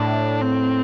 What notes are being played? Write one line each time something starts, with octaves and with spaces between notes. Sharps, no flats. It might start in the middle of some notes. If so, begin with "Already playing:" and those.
Already playing: A2 D4
C4